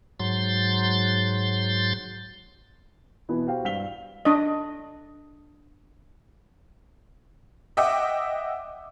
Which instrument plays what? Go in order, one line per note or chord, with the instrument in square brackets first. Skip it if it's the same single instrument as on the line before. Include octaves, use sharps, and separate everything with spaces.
[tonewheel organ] G#2 F#3 C6 G6 A6
[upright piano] B2 E3 B3 E4
F#4 G4 C5 F5 G5
G2 F5 B6 F7 G7
[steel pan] D4 D#5
[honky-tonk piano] D#5 E5 F#5 G5 D6